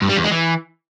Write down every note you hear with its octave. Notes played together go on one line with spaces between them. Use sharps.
G2
G3
E2
G#3
E3